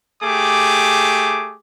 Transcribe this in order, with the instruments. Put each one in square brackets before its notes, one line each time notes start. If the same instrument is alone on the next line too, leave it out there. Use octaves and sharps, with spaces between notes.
[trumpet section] A3 G4 G#4 D6